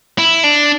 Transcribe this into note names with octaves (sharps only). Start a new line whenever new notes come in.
E4
D4